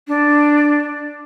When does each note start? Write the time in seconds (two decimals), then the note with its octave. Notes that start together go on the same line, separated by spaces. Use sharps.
0.08 D4